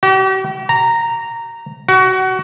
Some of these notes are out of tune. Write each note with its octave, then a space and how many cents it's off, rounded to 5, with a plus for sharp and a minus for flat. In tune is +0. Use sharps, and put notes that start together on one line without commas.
G4 -45
A#5 -10
F#4 +25